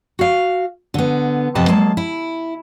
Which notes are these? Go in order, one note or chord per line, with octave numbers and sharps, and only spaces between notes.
F#4 F5
D3 B3
F2 C3 B3 B4 D#5 A5
F#3 G#3 A#3 A5
E4